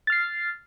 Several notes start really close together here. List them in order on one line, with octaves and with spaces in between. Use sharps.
A6 F6 C7